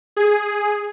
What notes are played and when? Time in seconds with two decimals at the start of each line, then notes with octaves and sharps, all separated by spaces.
0.16 G#4